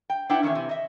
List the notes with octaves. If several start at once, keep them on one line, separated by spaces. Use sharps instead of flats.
G5
D4 E4 B4 E5 F#5 G5
D#3 E3 A3 C#4
C3 E3
D#5 E5